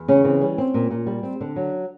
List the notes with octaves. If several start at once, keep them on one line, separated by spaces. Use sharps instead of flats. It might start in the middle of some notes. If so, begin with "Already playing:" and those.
Already playing: E2
C#3 C#4
E3 C4
G3 C#4
C4
A#2
A#2
G3
C4
D3 D4
F#3